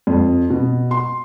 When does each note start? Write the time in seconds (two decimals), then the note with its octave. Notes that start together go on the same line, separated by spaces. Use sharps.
0.07 F2
0.50 B2
0.91 C6